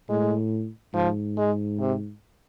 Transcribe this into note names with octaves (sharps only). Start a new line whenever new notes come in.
A2 G#3
G#2 F3
G#3
C3